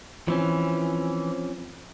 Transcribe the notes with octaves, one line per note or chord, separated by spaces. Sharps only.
E3 F3 C4 C#4